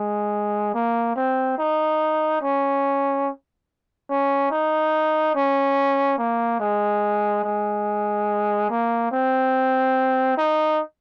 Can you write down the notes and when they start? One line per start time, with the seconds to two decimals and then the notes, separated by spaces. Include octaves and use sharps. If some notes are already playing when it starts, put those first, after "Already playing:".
Already playing: G#3
0.74 A#3
1.16 C4
1.58 D#4
2.42 C#4
4.09 C#4
4.51 D#4
5.35 C#4
6.18 A#3
6.60 G#3
7.44 G#3
8.70 A#3
9.11 C4
10.37 D#4